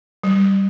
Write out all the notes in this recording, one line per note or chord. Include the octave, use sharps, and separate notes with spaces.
G3